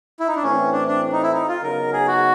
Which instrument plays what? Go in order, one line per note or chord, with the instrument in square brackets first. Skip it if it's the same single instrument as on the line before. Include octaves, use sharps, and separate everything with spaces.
[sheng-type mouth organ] E4
D#4
D4
[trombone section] A2 E3 A3 C4 [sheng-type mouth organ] C#4
[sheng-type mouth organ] D4
D4
D#4
E4
D#4
F4
[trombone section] C#3 F#3 B3 D#4 [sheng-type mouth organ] A#4
[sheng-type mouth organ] G#4
F#4